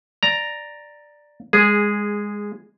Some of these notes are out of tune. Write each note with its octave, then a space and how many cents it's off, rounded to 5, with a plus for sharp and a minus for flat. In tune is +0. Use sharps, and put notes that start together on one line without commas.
D5 +5 A#5 +0
G#3 -15 G#4 +0